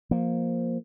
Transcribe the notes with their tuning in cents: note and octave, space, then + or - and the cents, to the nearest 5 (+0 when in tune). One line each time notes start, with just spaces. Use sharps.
F3 +0 A#3 +0